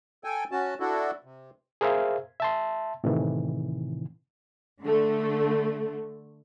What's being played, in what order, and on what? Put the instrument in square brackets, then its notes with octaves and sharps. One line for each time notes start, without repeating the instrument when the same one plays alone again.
[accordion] A4 G5 G#5
C#4 F#4 A5
D4 E4 F#4 A4
C3
[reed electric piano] G#4 A#4 C5 E5 F5
E5 A5 C6
A2 C3 D#3 E3
[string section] D3 A3